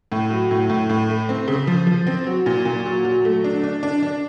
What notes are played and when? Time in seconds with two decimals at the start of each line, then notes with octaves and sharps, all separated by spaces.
0.12 A2
0.30 F#3
0.51 A2
0.70 A2
0.90 A2
1.10 A3
1.29 C4
1.48 C#3
1.67 F3
1.87 F3
2.07 C4
2.27 F#3
2.46 A#2
2.65 A#2
2.86 F#3
3.05 F#3
3.25 A3
3.44 D4
3.63 D4
3.83 D4
4.03 D4